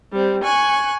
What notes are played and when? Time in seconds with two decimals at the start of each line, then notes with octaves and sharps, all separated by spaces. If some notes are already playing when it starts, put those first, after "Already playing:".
0.12 G3 C4
0.43 G#5 C#6 F#6